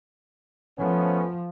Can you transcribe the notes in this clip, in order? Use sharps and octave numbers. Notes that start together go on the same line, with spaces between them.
F3 A3 B3 C#4